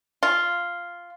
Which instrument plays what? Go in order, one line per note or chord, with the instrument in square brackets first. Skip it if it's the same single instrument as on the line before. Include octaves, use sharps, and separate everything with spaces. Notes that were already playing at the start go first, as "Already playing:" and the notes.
[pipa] F4